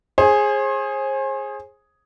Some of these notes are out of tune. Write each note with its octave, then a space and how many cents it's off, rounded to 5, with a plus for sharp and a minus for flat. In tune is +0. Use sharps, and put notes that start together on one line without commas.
G#4 +0 C5 +40